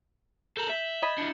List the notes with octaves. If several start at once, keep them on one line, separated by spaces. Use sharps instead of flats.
A4 A#4 G6 E7 F#7
E5 F#7 G7
D#5 B5 G#6 A6
D4 E4 C#7